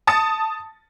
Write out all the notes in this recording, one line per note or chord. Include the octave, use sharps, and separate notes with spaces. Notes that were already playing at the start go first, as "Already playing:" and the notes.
A5 D#6 A6 C#7